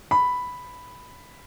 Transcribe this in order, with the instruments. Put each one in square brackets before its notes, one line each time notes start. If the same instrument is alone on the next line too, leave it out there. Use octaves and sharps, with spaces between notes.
[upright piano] B5